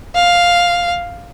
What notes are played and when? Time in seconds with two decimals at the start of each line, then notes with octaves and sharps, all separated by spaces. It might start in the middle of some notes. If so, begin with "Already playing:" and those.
0.15 F5